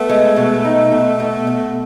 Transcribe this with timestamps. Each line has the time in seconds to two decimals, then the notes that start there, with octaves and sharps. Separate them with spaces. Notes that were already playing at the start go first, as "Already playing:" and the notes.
Already playing: A3 B3
0.10 G#3
0.36 B2
0.65 D#4
0.92 B2
1.20 B2
1.47 B2